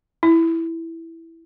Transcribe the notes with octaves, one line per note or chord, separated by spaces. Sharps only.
E4